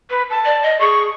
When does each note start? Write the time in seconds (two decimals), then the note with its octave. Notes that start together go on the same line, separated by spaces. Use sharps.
0.11 B4
0.30 A5
0.45 D5
0.63 D#5
0.81 G#4 C#6